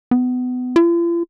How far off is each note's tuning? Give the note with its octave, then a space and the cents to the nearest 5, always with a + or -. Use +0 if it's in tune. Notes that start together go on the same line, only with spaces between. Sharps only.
B3 +25
F4 -45